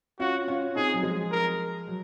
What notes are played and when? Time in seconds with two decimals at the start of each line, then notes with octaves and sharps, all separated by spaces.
0.20 C#4 F4 F#4
0.48 C#4 F4
0.76 C4 D#4 G#4
0.94 F#3
1.03 F3 G#3
1.32 A#4
1.87 F#3